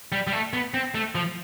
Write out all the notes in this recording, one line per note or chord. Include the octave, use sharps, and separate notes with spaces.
G3
G3
A3
B3
C4
A3
F3